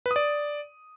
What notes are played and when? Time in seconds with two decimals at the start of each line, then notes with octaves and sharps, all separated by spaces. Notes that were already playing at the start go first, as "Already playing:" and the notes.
0.06 B4
0.11 D#6
0.16 D5